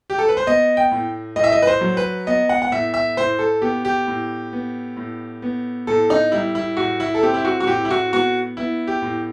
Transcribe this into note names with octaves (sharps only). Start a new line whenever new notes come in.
G4
A4
B4
C5
B3 D#5
G5
A2
A2 D#5
E5
D#5
B4
C5
F#3
B4
B3 D#5
F#5
F#5
A2 E5
E5
A2 C5
A4
B3 G4
G4
A2
B3
A2
B3
A2 A4
D#4
G3 E4
E4
A2 F#4
E4
A4
C4 G4
E4
F#4
F#4
A2 G4
E4
F#4
B3 F#4
B3 E4
G4
A2